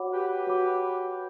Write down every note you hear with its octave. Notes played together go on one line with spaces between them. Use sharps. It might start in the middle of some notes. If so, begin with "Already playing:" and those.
Already playing: F#4 C#5 F#5 B5 D6
G4 B4
F#4 C#5 F#5 B5 D6